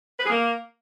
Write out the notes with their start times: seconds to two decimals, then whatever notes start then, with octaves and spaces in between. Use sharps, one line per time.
0.19 B4
0.24 G#4
0.30 A#3